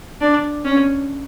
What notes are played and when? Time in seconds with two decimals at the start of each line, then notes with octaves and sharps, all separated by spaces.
0.21 D4
0.65 C#4